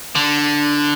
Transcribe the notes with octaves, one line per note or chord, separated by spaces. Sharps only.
D3